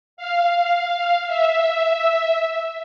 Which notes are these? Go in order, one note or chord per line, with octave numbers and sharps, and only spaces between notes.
F5
E5